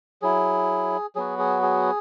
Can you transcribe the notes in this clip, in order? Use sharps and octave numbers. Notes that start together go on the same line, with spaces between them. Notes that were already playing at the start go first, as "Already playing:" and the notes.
F#3 E4 G#4
F#3 B3 F#4 G#4
G#4
G#4